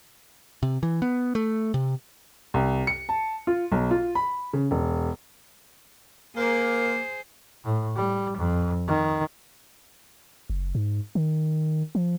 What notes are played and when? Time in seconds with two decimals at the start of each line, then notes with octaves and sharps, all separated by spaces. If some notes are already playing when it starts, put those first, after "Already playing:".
0.63 C3
0.83 E3
1.02 B3
1.35 A3
1.74 C3
2.54 C2
2.87 C#7
3.09 A5
3.47 F4
3.72 B1
3.91 F4
4.15 B5
4.53 C#3
4.71 E1
6.37 A#3 G#4 C5
7.64 A2
7.96 G3
8.37 F2
8.87 D#3
10.50 F#1
10.75 G#2
11.15 D#3
11.95 F3